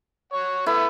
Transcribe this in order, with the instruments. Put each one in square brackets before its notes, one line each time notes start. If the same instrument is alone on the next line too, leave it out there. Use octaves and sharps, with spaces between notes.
[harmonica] C#5 F#5
[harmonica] A3 B3 [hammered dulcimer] E4